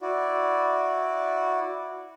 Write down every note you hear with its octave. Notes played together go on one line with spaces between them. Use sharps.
E4 F#4 D5